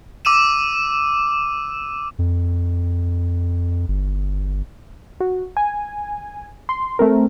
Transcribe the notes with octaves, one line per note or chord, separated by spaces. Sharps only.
D6 E6 D#7 E7
F2
G1
F#4
G#5
C6
A3 C4 A#4